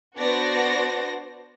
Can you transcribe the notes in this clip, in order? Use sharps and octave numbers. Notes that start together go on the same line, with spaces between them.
B3 D4 F#4 C5 D5 A#6